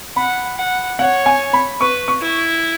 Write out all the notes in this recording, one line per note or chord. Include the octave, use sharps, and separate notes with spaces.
F#5 B5
F#5
C#5 F#5
G#5
B5
B4 C#6
C#6
E4